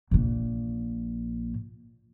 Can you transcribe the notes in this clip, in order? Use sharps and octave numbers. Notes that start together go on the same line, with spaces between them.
A#1 A#2